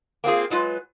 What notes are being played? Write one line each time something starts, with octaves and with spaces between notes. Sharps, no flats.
A#3 C4 F4 G#4
F#3 G#3 F4 B4